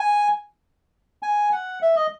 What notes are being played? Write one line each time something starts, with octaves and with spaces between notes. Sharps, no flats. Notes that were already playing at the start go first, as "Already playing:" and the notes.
Already playing: G#5
G#5
F#5
E5
D#5